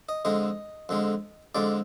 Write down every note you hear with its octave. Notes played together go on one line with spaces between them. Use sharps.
D#5
F2 D3 G#3 D#5
F2 D3 G#3
F2 D3 G#3 D5